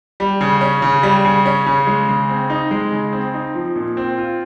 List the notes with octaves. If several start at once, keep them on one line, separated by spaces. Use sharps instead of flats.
G3
C#3
C#4
C#3
G3
C#3
C#4
C#3
G#3
C#3
C4
D#4
G#3
C#3
C4
D#4
F3
A#2
C4
F4